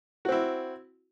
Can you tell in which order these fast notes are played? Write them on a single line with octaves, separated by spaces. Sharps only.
F#4 C4 E4